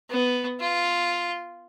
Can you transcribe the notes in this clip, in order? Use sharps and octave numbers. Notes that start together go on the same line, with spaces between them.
B3
F4